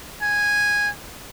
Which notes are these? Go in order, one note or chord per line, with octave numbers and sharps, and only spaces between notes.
G#5